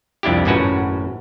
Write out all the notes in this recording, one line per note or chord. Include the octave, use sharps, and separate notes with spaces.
C2 F2 D4 E4 G4
G#1 F#2 A2 C#4 F#4 B4